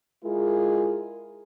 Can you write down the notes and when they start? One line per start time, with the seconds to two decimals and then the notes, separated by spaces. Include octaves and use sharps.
0.23 G#3 E4 F4 G#4 A#4